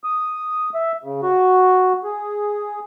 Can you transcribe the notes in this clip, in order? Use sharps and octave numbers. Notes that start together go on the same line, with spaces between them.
D#6
E5
C#3
F#4
G#4